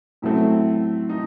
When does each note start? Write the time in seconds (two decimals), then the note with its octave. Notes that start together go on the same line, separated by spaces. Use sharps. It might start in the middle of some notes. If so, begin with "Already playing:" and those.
0.22 A2 F#3 A3 C4 E4
1.09 D#4